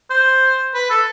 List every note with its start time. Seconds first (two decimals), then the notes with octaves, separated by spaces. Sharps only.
0.10 C5
0.74 B4
0.90 A4